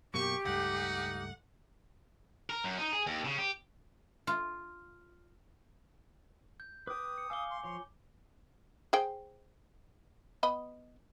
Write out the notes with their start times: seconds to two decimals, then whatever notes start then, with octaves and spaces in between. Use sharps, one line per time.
0.14 F#2 B2 A#3 G4 C#6
0.45 C#2 G2 A3 D#4 F#5
2.50 A#4
2.64 F#2
2.78 D#4
2.93 G#4
3.06 D#2
3.25 C#3
3.38 G4
4.27 F4
6.60 G6
6.87 B4 G5 D6 D#6
7.18 C#7
7.30 F5 G#5 D6 E6 G7
7.50 C6
7.64 F3 C#5 C6
8.93 G#4 C5 G5
10.43 B3 D#5 B5